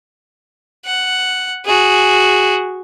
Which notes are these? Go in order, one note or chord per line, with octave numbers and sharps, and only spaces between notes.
F#5
F#4 G#4